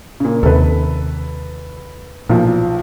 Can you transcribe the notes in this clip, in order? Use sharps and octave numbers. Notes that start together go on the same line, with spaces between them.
A#2 C#3
D#2 C3 A4 B4
B1 A#2 F3